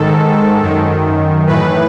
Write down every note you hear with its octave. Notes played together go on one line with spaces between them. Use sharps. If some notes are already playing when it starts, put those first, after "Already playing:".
Already playing: G#2 D#3 A4
F#2 D#3
A2 E3 B4